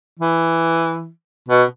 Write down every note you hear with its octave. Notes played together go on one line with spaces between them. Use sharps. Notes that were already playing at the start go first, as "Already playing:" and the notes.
E3
B2